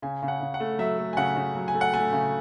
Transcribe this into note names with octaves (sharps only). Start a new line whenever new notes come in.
C#3 G#5
C#3
F#5
C#3
F#5
A3
F#3 E5
A3
G#5
C#3 F#5
C#3
F#3
G#5
A3
F#5
A3 G#5
C#3